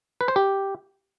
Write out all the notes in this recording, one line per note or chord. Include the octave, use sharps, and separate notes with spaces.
B4
C5
G4